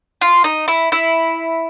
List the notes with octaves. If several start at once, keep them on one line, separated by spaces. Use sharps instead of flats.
F4
D#4
E4
E4